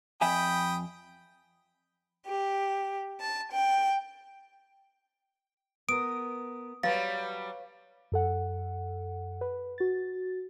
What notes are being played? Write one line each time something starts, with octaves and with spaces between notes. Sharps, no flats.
F2 E5 G5 G#5 B5 D#6
G4
A5
G5
B3 A#4 D#6 D7
F#3 G3 B4 C#5 F5 A6
F#2 A4 F#5
B4
F#4 A6